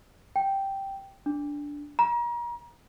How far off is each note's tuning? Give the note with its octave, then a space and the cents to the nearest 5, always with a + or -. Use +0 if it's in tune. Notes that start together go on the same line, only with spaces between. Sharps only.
G5 -5
D4 -10
A#5 +35